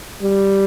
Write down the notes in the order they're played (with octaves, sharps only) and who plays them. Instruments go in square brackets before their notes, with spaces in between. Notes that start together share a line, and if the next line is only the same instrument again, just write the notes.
[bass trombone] G3